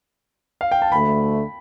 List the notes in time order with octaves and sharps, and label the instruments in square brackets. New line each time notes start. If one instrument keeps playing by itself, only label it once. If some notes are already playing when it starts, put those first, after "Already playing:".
[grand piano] F5
G5
A5
[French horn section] D2 D3 A3 [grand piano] B5